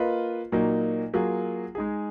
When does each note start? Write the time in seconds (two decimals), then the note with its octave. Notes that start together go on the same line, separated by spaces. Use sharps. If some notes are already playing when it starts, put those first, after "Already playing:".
Already playing: A#3 F4 B4 D#5
0.52 A#2 F#3 A#3 D#4
1.14 F#3 A#3 F4 G#4
1.75 G#3 D#4 G#4